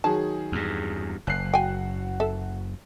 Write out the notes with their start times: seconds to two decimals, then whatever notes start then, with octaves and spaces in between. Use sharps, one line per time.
0.04 D#3 F#3 G#4 A5
0.52 E2 G2
1.27 F#1 F#6 C7
1.54 F#4 G5 G#5
2.20 A4 E5